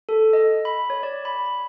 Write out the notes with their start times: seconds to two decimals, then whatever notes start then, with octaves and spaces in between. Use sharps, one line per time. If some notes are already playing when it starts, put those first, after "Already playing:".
0.09 A4
0.33 D#5
0.65 B5
0.90 C#5
1.03 D5
1.25 B5
1.46 B5